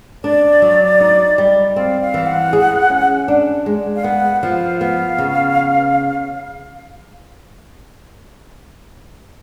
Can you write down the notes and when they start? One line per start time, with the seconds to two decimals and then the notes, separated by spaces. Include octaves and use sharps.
0.24 D4 D5
0.62 F#3
1.00 D#4
1.38 G3
1.76 C4 F5
2.01 F5
2.14 E3
2.26 F#5
2.53 G#4
2.90 C#4
3.28 D4
3.66 G#3
3.96 F5
4.04 B3 F#5
4.42 F3 F5
4.81 B3 F5
5.18 C#3